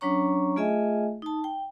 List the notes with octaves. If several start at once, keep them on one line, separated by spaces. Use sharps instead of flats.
F#3 C#4 D4 C#5 A#5 C#6
A3 F4 G#4 D#5 E5 G#5
D#4 A5
G5